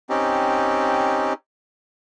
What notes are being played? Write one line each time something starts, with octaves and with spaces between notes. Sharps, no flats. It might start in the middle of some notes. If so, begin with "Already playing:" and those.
C4 C#4 D#4 G4